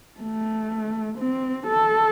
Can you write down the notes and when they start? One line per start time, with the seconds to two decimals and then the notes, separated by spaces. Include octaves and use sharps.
0.21 A3
1.19 C4
1.68 A4